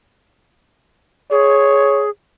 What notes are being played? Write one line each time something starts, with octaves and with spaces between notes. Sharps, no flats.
G#4 C#5